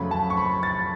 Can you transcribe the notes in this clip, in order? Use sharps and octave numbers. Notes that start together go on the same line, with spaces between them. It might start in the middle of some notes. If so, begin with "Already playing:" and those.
Already playing: F2 C#3 F#3 A3 C#4 B5
A5
C#6
B5
A6